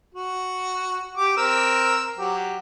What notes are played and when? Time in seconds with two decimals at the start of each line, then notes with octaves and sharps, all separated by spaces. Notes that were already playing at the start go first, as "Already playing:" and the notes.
0.14 F#4
1.17 G4 D6
1.37 C4 A#4 E6
2.18 F#3 G4